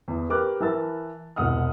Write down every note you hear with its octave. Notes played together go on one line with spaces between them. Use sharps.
E2
G4 A#4 B4 D6 F6 F#6
E3 A#4 B4 A5 E6 A6
E1 C2 F#5 D#6 F6